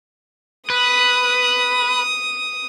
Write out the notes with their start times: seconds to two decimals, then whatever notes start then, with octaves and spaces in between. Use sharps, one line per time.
0.70 B4 D#6